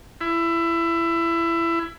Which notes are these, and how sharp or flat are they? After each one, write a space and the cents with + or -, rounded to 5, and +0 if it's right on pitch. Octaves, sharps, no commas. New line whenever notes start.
E4 +20